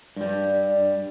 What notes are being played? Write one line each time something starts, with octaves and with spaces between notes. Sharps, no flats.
G2 G3